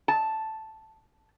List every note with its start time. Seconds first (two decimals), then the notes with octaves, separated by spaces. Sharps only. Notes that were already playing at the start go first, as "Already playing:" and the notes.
0.08 A5